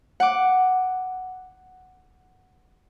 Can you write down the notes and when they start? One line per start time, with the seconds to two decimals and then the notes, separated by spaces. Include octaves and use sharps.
0.20 F#5 D6